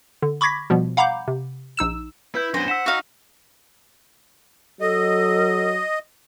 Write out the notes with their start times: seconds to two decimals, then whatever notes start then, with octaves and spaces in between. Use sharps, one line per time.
0.22 D3
0.41 B5 C#6 D6 G#6 A#6 B6
0.70 B2 F3 G3 B3
0.97 F5 F#5 A#5 B5 D6 G6
1.28 C3
1.77 A#1 D#4 E6 E7
2.35 E4 B4 G6
2.54 F#2 B3 D4 C5 A#6
2.68 F#5 E6 B6 E7
2.86 D#4 F#4 F5
4.81 F#3 A4 D#5